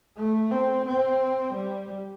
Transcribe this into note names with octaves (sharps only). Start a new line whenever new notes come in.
A3
C4
C4
G3